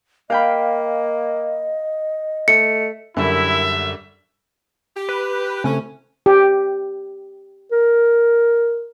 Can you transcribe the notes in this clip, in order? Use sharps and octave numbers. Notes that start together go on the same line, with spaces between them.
A#3 D#5 F5 G5 B5
A3 C#7
F#2 D3 G3 E4 A#4 E5
G4
B4
C#3 A3 C4 C#4 G#5
G4
A#4